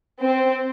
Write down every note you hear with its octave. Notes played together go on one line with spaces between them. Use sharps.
C4